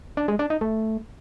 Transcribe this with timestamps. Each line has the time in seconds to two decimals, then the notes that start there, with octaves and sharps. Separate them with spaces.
0.17 D4
0.28 G#3
0.39 D4
0.50 D#4
0.61 A3